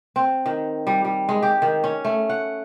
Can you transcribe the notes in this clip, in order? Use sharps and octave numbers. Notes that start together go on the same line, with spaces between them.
C4
D#3
G3
G3
G#3
G4
D#3
C#4
A3
F#5